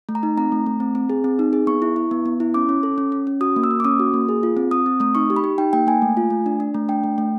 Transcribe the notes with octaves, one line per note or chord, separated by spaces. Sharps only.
A3
A#5
D#4
C4 A#5
A3
A3
C4
C4
G#4
C4
D#4
G#4
B3 C#6
E4
E4
B3
B3
E4
C#4 D6
C#4
A4
C#4
C#4
C#4
F#4 D#6
A#3
E6
A#3
D6
C#4 D#6
F#4
A#3
G#4
F4
C4
C4 D#6
C4
A3 D#6
D#4 C#6
G4
B5
G4
D#4 G5
A#3 G5
A#3 G#5
A3
F4
A3
D4
D4
A3
D4 G5
A3
A3